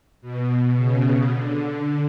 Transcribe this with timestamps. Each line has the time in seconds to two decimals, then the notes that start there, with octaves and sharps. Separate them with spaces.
0.22 B2
0.75 C#3
1.28 D3